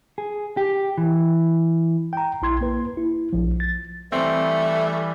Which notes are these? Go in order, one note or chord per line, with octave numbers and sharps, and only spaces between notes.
G#4
G4
E3
G5 A#5
A#1 E4 C6 G#6
A#3 B4
E4
A#1 F3
A6
E3 G3 A3 C4